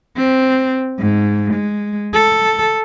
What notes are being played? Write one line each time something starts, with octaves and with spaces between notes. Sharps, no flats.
C4
G#2
G#3
A4